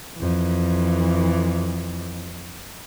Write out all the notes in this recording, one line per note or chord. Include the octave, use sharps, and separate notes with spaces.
F2 E3